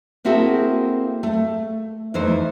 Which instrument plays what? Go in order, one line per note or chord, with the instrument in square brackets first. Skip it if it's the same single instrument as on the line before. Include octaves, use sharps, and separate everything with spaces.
[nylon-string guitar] A#3 C4 E4 F#4 G#4 A4
A3
F2 E3 A3 D#4 C5